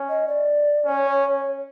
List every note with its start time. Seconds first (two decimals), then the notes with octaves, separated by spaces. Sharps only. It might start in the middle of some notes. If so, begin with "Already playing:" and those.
Already playing: C#4
0.09 D#5
0.28 D5
0.86 C#4 C#5